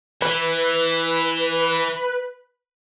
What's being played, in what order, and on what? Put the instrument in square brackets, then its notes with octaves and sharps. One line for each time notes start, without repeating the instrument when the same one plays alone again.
[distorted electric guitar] E3 [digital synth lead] B4